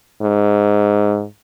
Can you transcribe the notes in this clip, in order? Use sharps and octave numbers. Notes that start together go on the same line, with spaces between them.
G#2